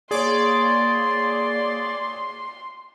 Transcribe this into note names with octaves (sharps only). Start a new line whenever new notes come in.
A#3 G#4 C#5 D5 C6